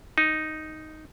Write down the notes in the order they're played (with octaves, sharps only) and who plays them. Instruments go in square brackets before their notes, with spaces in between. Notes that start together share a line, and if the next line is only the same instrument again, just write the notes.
[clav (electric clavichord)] D#4